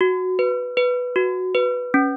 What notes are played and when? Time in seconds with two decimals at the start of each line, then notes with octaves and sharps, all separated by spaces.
0.01 F#4
0.39 B4
0.77 B4
1.16 F#4
1.55 B4
1.94 C#4